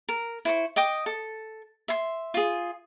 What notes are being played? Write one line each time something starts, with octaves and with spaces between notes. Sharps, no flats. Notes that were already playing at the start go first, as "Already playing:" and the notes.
A#4
E4 C5 C#6
D#5 G5 D6 D#6
A4
E5 C6
F4 G#4